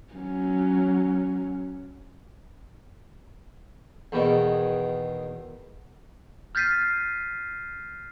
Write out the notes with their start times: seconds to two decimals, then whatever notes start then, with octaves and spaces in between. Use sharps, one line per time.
0.13 F#3 C#4
4.12 E2 B2 D#3
6.55 F6 G6 A6 B6 C7 D#7